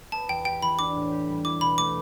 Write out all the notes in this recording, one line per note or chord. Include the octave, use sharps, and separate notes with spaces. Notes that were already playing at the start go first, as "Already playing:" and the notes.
B3 A5
E2 G5
G4 G5
E3 B5
D4 D6
A2
G4
G3
E4 D6
B2 B5
A3 D6